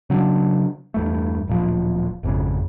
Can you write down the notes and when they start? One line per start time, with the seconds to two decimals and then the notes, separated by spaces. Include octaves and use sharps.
0.10 C#3 F#3 C#4 D4
0.94 E2 G2 A3
1.47 D1 A#2 F3
2.23 G#1 F2 C#3